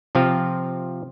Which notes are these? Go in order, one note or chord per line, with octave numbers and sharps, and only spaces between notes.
C3 F3 C4 F4 F5